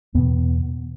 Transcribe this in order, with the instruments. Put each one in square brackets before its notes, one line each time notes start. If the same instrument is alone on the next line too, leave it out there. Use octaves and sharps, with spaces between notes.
[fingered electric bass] E2 B2 B3